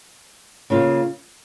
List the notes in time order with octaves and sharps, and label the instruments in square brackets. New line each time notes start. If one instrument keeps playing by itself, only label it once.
[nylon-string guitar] C#3 A#3 F4